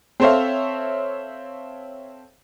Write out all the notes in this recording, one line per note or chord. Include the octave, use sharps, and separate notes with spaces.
C4 A4 C5 C#5 E5 F5